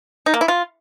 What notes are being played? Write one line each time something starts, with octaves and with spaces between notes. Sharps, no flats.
D#4
A#3
E4
F4